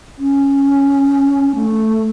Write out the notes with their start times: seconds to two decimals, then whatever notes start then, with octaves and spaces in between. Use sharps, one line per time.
0.18 C#4
1.55 A3